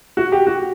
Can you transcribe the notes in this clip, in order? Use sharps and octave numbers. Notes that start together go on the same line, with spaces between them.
F#4
G4
F#4